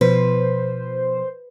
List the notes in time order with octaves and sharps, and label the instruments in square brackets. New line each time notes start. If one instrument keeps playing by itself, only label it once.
[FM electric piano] B2 F3 [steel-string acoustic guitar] B4 [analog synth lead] C5